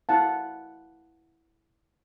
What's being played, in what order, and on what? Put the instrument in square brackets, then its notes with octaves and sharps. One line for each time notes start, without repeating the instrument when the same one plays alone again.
[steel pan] E4 F5 F#5 A5